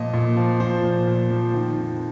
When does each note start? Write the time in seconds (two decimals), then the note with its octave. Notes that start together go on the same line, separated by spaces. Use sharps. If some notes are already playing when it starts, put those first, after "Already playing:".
Already playing: A#2 F3 D#5
0.14 A#2
0.37 F3
0.60 F3 C5
0.83 A#2
1.07 A#2
1.30 F3
1.54 D#3
1.77 F2